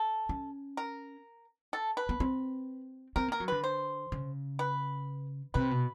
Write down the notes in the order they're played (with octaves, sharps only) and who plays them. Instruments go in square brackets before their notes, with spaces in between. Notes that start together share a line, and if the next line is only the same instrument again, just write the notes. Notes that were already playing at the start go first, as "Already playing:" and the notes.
Already playing: [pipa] A4
[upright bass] C#4
[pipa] A#4
A4
B4
[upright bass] B3
C4
[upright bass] C4 [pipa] A#4
[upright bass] A#3 [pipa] A#4
[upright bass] F#3
[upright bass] D3 [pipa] B4
[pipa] C5
[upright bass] C#3
[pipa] B4
[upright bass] C3 [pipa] B4
[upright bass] B2